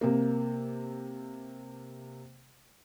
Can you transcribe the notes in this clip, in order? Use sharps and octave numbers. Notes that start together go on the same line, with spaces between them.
C3 A#3